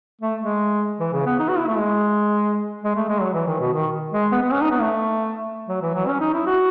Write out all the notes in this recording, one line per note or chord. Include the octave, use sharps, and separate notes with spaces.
A3
G#3
E3
C#3
B3
D#4
F#4
E4
A3
G#3
G#3
A3
G#3
F#3
E3
D#3
B2
D#3
G#3
B3
B3
C#4
D#4
B3
A3
F#3
E3
F#3
C#4
D#4
E4
F#4